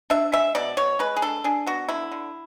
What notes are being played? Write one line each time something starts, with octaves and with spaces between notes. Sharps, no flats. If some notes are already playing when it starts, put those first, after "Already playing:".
D4 E5
G#3 E5
B2 D5
B2 C#5
G#3 B4
G#4
D4 A4
D4 G#4
B3 F#4
D3 E4
D3